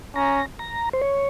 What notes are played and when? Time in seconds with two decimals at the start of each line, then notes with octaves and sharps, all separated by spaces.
0.16 C#4 A#5
0.59 A#5
0.93 C5
1.02 C#5